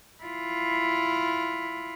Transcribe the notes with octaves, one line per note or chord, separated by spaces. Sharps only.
E4 F4